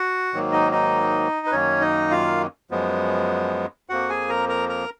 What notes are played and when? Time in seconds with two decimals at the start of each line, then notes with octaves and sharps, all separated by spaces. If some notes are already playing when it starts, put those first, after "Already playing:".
Already playing: F#4 F#5
0.33 G#2 D#3 F#3 A#3
0.52 D#4 D#5
0.72 D#4 D#5
1.47 B4
1.51 F#2 D#3 A#3 C#4 C#5
1.81 D#4 D#5
2.11 F4 F5
2.71 F#2 F3 G#3 B3
3.89 F2 F3 A#3 F#4 F#5
4.09 G#4 G#5
4.29 A#4 A#5
4.49 A#4 A#5
4.69 A#4 A#5